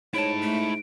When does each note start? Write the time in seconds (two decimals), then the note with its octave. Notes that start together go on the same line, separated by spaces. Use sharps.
0.14 G#2 E4 C#5 A5 D7
0.42 A3